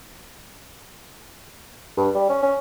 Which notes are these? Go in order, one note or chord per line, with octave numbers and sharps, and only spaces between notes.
G2
G3
C#4
C#4